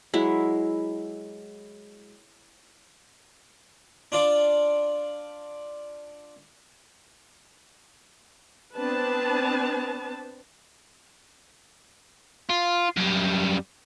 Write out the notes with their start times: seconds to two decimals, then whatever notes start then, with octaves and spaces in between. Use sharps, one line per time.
0.14 F#3 G#3 E4
4.12 D4 F4 D5
8.77 B3 C4 D4 B4 A5
12.50 F4
12.97 F#2 G3